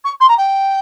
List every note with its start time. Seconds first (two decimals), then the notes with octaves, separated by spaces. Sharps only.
0.04 C#6
0.20 C6
0.29 A#5
0.38 G5